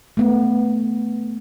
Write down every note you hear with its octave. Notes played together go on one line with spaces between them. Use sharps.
A3 B3